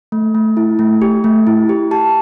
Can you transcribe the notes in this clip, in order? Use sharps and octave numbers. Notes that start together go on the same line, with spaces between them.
A3
A3
E4
A3
G4
A3
E4
G4
G4 A5